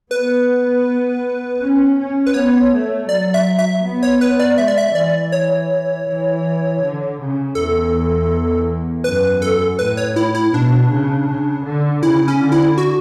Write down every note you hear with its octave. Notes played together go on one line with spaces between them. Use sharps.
B3 B4
C#4
C#4
B4
B3 C#5
A3
F#3 D5
E5
E5
B3
C#5
B4
D5
G#3 E5
D5
E5
E3 D5
C#5
E3
D3
C#3
E2 A4
F#2 B4
A4
A2 B4
C#5
E4
E4
B2 D4
C#3
C#3
D3
C#3 E4
C#4
D3
E4
F#4